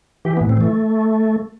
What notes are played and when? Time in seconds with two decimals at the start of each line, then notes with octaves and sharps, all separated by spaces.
0.25 E3 G4
0.37 B3
0.41 A2
0.49 C4
0.57 E3 A3